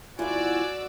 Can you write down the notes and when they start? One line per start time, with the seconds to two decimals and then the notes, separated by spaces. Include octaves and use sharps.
0.19 E2 G#2 F4 F#4 D5 G#5 E6